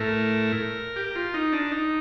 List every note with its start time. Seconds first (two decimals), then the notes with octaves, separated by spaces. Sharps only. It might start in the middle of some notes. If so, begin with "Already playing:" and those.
Already playing: A2 A3 A#4
0.96 G4
1.16 F4
1.34 D#4
1.53 D4
1.72 D#4